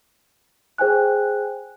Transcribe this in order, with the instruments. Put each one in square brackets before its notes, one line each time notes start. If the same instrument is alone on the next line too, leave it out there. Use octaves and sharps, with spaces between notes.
[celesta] G#4 C5 G5 G#5 F#6